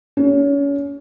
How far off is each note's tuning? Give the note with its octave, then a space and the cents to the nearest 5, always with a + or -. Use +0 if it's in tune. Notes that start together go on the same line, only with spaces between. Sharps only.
C#4 +30